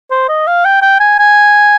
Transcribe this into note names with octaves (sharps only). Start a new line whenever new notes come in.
C5
D#5
F5
G5
G5
G#5
G#5